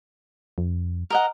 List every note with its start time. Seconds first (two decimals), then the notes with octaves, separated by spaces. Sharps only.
0.58 F2
1.10 A#4 D#5 F#5